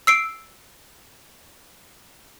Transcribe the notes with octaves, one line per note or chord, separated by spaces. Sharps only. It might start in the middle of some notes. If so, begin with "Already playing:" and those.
E6 C7 D7